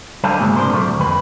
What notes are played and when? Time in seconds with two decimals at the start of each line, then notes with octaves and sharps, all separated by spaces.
0.24 D3 G3 C5 F5 G#5 A5
0.39 C#2 G2 B2 G#3 A#3
0.56 G#2 C3 F3 D4 A#4 C5
0.73 A#2 F#3 A3 A#3
0.85 D2
0.99 F2 B4